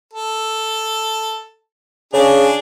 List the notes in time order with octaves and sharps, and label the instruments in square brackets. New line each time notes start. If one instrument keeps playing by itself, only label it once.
[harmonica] A4
[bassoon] C#3 [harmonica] D4 G#4